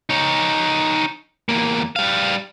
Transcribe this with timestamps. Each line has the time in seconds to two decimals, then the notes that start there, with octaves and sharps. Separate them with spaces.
0.10 D#4 C#5
1.49 E2 A#3
1.96 G3 F5